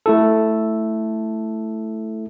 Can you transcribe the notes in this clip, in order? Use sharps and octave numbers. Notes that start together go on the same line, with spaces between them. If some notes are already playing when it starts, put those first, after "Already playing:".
A3 E4 A4